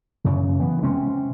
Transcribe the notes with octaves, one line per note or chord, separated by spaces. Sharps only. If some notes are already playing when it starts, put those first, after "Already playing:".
F#2 C#3
E3 B3
C3 G#3 C4 C#4